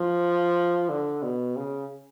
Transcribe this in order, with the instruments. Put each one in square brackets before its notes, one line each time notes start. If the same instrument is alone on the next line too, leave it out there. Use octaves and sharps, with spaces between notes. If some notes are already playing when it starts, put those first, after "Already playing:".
Already playing: [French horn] F3
D3
B2
C#3